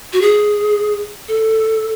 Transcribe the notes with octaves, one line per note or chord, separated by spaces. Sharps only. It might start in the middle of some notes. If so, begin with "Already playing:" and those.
F#4
G#4
A4